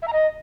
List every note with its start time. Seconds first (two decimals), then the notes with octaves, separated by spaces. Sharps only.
0.02 E5
0.07 A#5
0.13 D#5